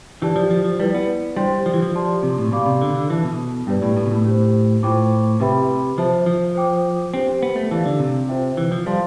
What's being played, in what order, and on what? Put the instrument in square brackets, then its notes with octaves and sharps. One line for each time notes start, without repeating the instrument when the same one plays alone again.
[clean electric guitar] E3 [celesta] D4 G4 D5 A5
[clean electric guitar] F3
F3
F3
[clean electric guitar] G3 [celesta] E4 B4 D5
[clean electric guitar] B3
[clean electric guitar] G3 [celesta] D4 G4 C5 G5 C6
[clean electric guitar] F3
E3
F3
[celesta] G4 D5 A5 C6
[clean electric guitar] C3
A2
[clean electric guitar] B2 [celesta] G4 D5 F5 B5 D6
[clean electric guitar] C3
D3
D3
[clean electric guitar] E3 [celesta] A4 E5 A5
[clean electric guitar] B2
[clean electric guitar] G2 [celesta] D4 G4 B4 D5
[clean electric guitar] A2
A2
B2
A2
[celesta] D4 G4 C5
[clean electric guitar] A2 [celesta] F4 C5 G5 D6
[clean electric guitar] C3 [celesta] G4 B4 E5 G5 B5
[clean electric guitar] F3 [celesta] C5 E5 A5
[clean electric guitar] F3
[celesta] C5 G5 D6
[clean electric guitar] C4 [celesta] D4 G4 C5
[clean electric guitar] B3
A3
[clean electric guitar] E3 [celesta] G4 D5 F5 A5
[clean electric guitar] D3
C3
[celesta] F4 C5 E5 G5
[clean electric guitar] E3
F3
[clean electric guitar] G3 [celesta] A4 C5 F5 A5 C6